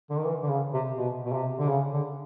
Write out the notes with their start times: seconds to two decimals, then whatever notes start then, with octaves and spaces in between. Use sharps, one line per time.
0.10 D3
0.17 D#3
0.26 E3
0.43 D3
0.50 C#3
0.74 C3
0.97 B2
1.25 B2
1.33 C3
1.59 D3
1.69 C#3
1.93 D3